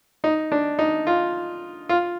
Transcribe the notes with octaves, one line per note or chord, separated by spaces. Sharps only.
D#4
D4
D#4
F4
F4